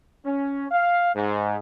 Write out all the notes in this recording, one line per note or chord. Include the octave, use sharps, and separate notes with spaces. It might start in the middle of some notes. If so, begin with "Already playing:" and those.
C#4
F5
G#2